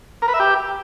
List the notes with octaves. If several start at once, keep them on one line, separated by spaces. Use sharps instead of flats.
A#4
B4
E5
G4